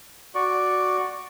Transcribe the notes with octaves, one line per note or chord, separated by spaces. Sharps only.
F#4 D5 C#6